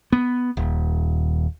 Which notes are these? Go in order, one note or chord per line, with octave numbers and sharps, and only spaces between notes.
B3
D#1